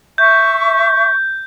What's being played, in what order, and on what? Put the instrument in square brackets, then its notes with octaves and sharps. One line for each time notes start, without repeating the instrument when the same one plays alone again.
[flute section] E5 C#6 [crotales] G6